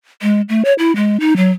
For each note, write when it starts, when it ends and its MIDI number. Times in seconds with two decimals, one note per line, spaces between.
0.22 0.41 56
0.49 0.63 57
0.65 0.73 73
0.79 0.94 64
0.96 1.20 56
1.20 1.36 63
1.37 1.51 54